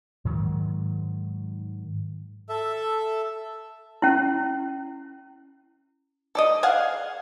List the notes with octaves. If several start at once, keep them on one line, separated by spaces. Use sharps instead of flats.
G#2 D#3 F#3 G#3
A4 E5
C#4 E4
A4 D5 D#5
G#4 F5 F#5 G#5